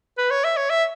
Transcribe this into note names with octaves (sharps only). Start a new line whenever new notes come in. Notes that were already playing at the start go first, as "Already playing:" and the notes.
B4
C#5
E5
C#5
E5